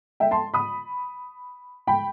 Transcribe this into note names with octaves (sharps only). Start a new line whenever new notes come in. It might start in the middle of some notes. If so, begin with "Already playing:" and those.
E5 G5
A5 C6
B5 D#6
G5 B5